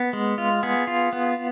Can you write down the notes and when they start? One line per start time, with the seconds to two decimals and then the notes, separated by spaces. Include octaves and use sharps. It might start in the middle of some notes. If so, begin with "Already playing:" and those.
Already playing: B3
0.13 G#3
0.38 F4
0.63 B3 G#4
0.87 F4
1.13 B3